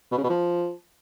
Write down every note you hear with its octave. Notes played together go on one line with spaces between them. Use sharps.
B2
C#3
B2
F3